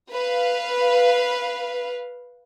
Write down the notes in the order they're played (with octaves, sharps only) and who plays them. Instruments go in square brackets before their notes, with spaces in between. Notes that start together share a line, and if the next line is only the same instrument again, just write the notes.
[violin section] B4 F5